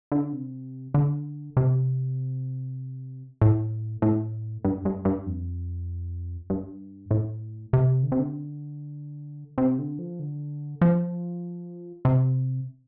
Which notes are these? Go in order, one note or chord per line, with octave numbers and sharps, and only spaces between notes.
D3
C3
D3
C3
A2
A2
G2
G2
G2
F2
G2
A2
C3
D3
C3
D3
C3
D3
F3
D3
F3
C3